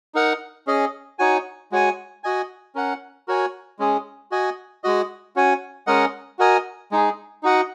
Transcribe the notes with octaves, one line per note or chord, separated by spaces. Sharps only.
D#4 A#4 F#5
C#4 G#4 D#5
D#4 F#4 C#5 G#5
G#3 F#4 C#5 G#5
F#4 D#5 G#5
C#4 A#4 F#5
F#4 A#4 C#5 G#5
G#3 C#4 G#4
F#4 D#5 G#5
G#3 F#4 D#5
C#4 F#4 C#5 G#5
G#3 C#4 A#4 D#5 F#5
F#4 A#4 D#5 G#5
G#3 D#4 G#4
D#4 F#4 D#5 F#5